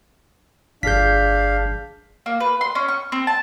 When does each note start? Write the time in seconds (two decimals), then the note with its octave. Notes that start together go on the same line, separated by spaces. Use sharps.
0.83 G1 D4 G#4 F5 G6 B6
2.26 A#3
2.40 B4
2.61 C6
2.75 C#4
2.88 C#6
3.12 C4
3.27 A5